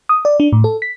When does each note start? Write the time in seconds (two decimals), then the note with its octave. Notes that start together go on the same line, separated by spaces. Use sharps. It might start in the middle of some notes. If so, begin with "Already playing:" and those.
0.09 D#6
0.25 D5
0.40 D4
0.52 A2
0.64 A4
0.82 B6